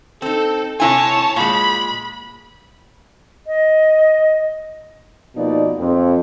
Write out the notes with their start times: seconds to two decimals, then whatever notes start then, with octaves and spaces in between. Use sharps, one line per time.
0.22 C4 D#4 A4
0.80 C3 E4 C#5 G#5 A5
1.36 A#2 G#3 B5
3.47 D#5
5.36 B2 F3 A#3 D#4 D5
5.78 F2